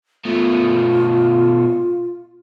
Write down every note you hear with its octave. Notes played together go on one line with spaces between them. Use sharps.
B2 A3 F4